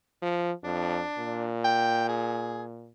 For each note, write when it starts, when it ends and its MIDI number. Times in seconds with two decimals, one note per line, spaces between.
0.22 0.52 53
0.64 1.01 41
0.64 1.48 62
1.18 2.91 46
1.64 2.08 79
2.09 2.63 68